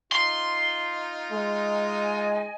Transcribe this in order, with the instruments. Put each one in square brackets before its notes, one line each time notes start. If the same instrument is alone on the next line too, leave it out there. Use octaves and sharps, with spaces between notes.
[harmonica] D#4 F4 [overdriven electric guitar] C6
[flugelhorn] G#3
[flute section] D#5 G#5